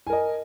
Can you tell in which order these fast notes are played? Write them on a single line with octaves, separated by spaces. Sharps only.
G#5 A#4 D#5